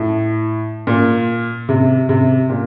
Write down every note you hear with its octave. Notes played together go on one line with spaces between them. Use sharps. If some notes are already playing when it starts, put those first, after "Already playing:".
Already playing: A2
A#2
C3
C3
A#2